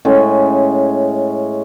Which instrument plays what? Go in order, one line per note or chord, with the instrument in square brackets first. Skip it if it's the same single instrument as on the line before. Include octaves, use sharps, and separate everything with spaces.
[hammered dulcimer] A2 G#3 C#4